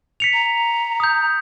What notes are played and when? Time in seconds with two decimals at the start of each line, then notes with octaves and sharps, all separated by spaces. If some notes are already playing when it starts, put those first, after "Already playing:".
0.20 B6 C#7 F7
0.33 A#5
1.00 D#6 G6